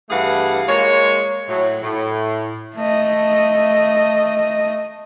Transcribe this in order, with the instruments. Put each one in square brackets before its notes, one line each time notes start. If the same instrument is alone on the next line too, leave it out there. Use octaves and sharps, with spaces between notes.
[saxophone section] G2 E3 A3 G#4 F5 F#5
G#3 A#3 F4 C#5
A2 F#3
A2
[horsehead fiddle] A3 D#5